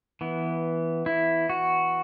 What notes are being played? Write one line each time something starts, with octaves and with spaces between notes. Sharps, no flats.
E3 B3
E4
F#4